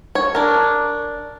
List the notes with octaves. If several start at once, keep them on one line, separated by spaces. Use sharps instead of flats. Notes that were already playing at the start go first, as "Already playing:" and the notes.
C#5
D4 A#4